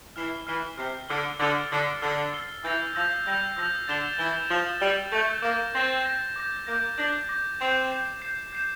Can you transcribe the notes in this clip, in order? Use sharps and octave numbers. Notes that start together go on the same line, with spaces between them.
E3 F6 C7 G7
E3 F6 C7 G7
C3 F6 C7 G7
D3 F6 C7 G7
D3 E6 A6 C7 G7
D3 E6 A6 C7 G7
D3 E6 A6 C7 G7
E6 A6 C7 G7
E3 E6 G6 A#6 F7
F3 E6 G6 A#6 F7
G3 E6 G6 A#6 F7
F3 E6 G6 A#6 F7
D3 A6 E7 G7
E3 A6 E7 G7
F3 A6 E7 G7
G3 A6 E7 G7
A3 G6 A#6 E7
A#3 G6 A#6 E7
C4 G6 A#6 E7
G6 A#6 E7
D6 G6 A#6
A#3 D6 G6 A#6
D4 D6 G6 A#6
D6 G6 A#6
C4 G6 C7 E7
G6 C7 E7
G6 C7 E7
G6 C7 E7